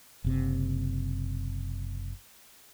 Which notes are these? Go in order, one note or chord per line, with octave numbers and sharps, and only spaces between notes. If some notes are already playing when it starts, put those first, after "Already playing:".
F#1 C3